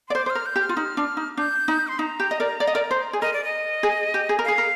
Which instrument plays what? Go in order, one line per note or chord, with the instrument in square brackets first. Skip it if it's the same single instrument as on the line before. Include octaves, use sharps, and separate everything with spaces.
[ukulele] D5 [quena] C6
[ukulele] C5 [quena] D6
[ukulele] C5 [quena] F6
[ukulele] A#4
[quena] G6
[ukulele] G4
[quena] F6
[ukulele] F4
D#4
D4
D#4
[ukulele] D4 [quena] G6
[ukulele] D#4
[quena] C6
[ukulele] D#4 [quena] A#5
[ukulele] G4
D#5
A#4 D5
D5
D#5
A#4 D5
C5
G#4
[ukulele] A#4 [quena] D#5
[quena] D5
D#5
[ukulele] G#4
G4
G#4
A#4
[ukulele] G#4 [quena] F5
[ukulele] A#4